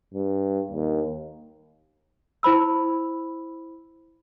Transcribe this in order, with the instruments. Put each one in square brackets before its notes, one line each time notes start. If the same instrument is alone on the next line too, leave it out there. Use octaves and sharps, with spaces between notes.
[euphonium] G2
D#2
[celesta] E4 C5 B5 E6